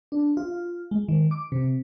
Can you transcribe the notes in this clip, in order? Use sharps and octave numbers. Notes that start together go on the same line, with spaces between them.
D4
F4
G#3
D#3
D6
C3